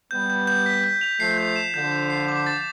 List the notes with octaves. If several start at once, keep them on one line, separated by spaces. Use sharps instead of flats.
G3 B3 G6
G6
G6
B6
G6
F7
F3 A3 C7
G6
E7
D3 F3 G6
G6
C7
D6
A6